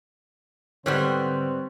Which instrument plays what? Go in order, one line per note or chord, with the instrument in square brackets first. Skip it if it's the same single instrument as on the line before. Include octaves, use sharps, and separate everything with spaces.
[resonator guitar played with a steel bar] G#2 G3 B3 [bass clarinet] D3 [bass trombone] C4 [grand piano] C#5 F#6